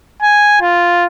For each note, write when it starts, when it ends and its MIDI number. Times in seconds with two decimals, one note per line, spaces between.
0.22 0.60 80
0.61 1.05 65